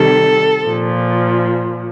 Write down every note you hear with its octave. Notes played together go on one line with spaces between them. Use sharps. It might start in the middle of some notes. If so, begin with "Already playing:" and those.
Already playing: C3 D#3 G3 A4
A#2 F3